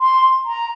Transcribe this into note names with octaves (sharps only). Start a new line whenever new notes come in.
C6
A#5